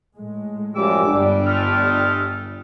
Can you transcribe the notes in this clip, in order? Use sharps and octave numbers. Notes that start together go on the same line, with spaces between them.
A2 G#3
F#2 F3 G3 D6 E6
G1 G3 D4
G#3 A3 F6